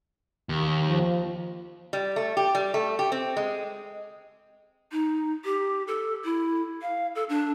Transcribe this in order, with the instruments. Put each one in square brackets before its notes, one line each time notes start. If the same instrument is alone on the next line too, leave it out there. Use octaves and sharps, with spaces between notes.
[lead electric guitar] D#2
[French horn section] F3
[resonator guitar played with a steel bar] G3
A3
G4
G3
A3
G4
C4
G#3
[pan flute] D#4
G4
A4
E4
F5
A4
D4